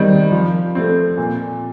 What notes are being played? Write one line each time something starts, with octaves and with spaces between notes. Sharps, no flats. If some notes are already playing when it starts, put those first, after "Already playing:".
Already playing: C3 D#3 G3 C4
F3
A3 C4
A#2